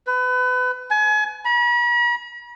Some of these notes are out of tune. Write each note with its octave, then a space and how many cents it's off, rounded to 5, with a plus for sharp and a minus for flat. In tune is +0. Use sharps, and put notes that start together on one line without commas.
B4 +30
G#5 +35
B5 -45